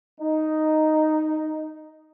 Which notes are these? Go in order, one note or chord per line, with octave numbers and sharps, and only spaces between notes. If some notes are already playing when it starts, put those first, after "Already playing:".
D#4